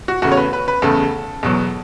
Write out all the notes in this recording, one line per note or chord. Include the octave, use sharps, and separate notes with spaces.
F#4
E2 C#3 A3 F#4
C#5
B4
B4
B4
E2 C#3 A3 A4
E2 B2 F#3